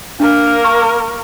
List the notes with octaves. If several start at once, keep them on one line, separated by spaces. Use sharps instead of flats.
A#3 D4 A#4
C#6